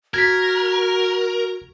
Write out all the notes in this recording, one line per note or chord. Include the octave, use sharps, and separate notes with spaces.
F#4 A#4 G#6 B6